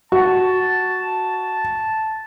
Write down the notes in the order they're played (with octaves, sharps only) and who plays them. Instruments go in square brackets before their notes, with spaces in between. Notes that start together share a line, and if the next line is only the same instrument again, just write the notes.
[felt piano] F#4 [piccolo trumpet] A5